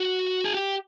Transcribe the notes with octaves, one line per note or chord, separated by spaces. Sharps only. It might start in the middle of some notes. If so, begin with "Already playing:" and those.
Already playing: F#4
G#4
G4